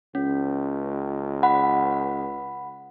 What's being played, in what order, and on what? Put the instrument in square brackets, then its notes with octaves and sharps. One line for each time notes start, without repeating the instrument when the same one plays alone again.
[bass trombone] C#2 [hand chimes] C#4
[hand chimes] F#5 B5